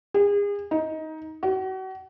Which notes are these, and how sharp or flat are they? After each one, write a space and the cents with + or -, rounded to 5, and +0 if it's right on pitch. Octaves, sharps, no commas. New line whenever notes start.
G#4 -35
D#4 +15
F#4 +35